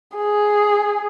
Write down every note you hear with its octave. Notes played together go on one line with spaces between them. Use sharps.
G#4